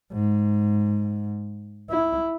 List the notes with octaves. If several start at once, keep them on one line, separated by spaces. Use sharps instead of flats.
G#2
E4